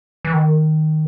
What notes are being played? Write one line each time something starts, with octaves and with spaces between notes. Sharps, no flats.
E3
D#3